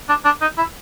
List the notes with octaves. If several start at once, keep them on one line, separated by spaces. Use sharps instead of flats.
D4
D4
D#4
E4